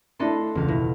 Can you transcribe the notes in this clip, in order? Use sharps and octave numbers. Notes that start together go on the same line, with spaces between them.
A3 D4 E4 A4 D#5 C6
E1 C#2 F5
B2 E4